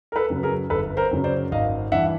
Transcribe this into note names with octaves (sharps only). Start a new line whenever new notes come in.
A#4
A4 B4
F#2 C#3 F#3
G#4 A#4
G1 A4 B4
A#4 C5
F#2 C#3 F#3
C5 D5
G#1 D#5 F5
G2 E3 E5 F#5